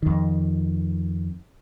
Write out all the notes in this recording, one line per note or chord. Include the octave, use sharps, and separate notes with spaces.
F2 D#3